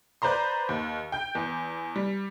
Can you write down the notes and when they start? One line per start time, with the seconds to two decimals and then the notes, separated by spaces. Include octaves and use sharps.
0.22 B4 C5 D5 A#5 C6
0.69 D#2
1.12 G5 G6
1.35 E2
1.96 G3